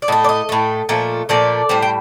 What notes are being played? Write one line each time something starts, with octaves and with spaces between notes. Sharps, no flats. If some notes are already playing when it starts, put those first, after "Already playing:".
D5
A2 A3 D#5
D5
D#5
A2 A3
A#2 F3 A3
A#2 F3 A3 D5
A2 G3 C5
G5